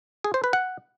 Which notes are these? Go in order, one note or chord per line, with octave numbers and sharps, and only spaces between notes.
G#4
C5
B4
F#5